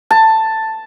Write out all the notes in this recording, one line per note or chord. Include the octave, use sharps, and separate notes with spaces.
A5